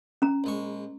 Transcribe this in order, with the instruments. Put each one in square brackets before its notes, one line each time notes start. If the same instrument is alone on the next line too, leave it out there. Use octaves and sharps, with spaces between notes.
[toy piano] C#4 A#5
[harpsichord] A#1 G#3 C#6